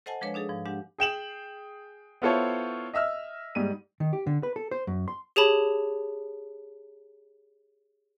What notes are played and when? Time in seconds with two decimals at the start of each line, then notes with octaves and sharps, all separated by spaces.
0.06 A4 C5 D#5 F#5 G#5 A5
0.21 F3 G#3 D4 B4 C#5
0.34 D4 D#4 G#4 A4
0.49 G#2 F3
0.66 G#3 D4 G4 F#5
0.98 G#4 G5 E7 F#7
2.22 B3 E4 F4 A4 C5 C#5
2.93 D#5 E5 E6 F6
3.55 G#2 G3 D#7
4.00 D#3
4.13 G4
4.27 D3
4.43 B4
4.56 A4
4.71 C5
4.87 F#2
5.08 C6
5.36 G4 G#4 C#5 A5 B5